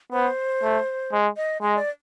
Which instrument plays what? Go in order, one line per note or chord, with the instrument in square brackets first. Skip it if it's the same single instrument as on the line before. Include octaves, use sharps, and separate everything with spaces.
[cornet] B3 [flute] C5
[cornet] A3
G#3
[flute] D#5
[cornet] G#3 [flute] D#5
[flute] D5